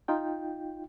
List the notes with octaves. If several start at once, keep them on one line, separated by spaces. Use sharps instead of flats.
D#4 F4 G5